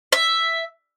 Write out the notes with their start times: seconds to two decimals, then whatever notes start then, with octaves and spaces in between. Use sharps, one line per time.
0.13 E5